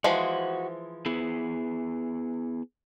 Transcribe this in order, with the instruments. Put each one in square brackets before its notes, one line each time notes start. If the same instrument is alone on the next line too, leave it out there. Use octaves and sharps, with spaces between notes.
[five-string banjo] E3 F3 G#3 [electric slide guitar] F#4
[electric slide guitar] B3 E4 G#4